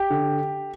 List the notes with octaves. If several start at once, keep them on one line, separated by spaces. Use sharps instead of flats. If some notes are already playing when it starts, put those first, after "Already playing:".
Already playing: G4
D3